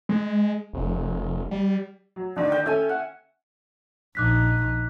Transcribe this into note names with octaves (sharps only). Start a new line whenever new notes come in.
G#3
F1
G3
F#3
D3 D#3 D5
G5
C#4 A4 E5 G#5
F#5
A#1 D#4 D6 F#6 B6